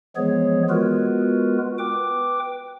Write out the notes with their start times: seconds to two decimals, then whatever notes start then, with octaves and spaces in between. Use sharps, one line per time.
0.16 E3 F3 G#3 B3 G#4 C#5
0.70 G#3 B3 F4 F#4 A#4 B4
1.79 B4 G5 D6